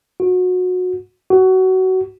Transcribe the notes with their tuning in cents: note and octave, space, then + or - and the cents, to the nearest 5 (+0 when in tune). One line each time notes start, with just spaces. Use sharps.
F#4 -25
F#4 +20